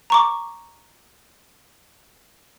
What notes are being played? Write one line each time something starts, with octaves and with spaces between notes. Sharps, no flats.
A#5 C#6 D6